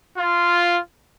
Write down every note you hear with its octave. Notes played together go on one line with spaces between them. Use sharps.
F4